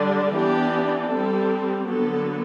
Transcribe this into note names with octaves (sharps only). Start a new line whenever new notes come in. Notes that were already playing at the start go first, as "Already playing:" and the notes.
Already playing: D3 G3 D4
E3 B3 D4 G4
G3 C4 A4
D3 F#3 B3 A4